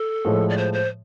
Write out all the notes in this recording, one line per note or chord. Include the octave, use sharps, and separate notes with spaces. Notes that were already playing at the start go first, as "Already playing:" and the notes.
Already playing: A4
A2 F3 G#3
D5
C5
C5